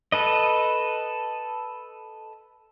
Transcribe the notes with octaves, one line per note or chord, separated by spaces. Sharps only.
A4 B4 D#5